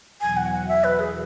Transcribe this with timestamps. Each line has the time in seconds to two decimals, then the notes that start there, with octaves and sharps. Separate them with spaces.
0.21 E2 B2 F#3 G#5
0.37 F#5
0.52 F#5
0.68 E5
0.84 B4
1.00 G#4